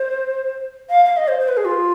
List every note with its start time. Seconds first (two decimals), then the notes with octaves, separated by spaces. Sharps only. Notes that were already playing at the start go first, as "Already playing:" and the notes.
Already playing: C5
0.89 F5
1.05 F5
1.16 D#5
1.28 C5
1.39 C5
1.48 B4
1.57 G#4
1.65 F4